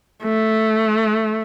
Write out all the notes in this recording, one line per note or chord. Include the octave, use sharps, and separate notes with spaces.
A3